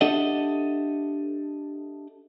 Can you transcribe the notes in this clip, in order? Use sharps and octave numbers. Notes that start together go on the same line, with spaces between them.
D4 G4 A4 D#5 E5 F#5